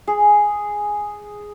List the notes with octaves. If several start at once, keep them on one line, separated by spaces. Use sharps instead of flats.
G#4